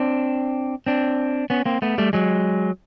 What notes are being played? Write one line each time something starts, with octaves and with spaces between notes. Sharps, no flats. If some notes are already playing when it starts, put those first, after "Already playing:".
Already playing: C4 D4
C4 D4
B3 C#4
A#3 C4
A3 B3
G3 A3
F#3 G#3